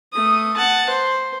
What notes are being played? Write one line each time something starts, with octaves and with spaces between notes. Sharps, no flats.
A3 D#6
F#5 A5
C5